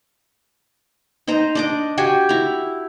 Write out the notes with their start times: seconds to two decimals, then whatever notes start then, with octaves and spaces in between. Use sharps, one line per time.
1.28 D#4 C5 D#5 A#5
1.55 D4 D#5 D6
1.98 F#4 G4 G#5
2.29 E4 A#5